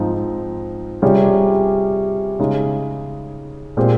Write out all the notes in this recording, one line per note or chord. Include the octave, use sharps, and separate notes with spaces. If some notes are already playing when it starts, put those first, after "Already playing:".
Already playing: G#2 F3 C4 D#4
C3 G3 C#4 F4 G#4
C#3 G#3 D#4
A#2 G#3 C4 G4 C5